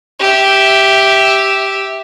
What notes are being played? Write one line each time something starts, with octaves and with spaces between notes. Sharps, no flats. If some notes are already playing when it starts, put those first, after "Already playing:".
G4 E5